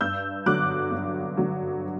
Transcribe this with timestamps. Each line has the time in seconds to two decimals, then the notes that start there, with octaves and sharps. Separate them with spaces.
0.01 G2 E6 G6
0.46 D3 F#3 D6 F#6
0.92 G2
1.37 D3 F#3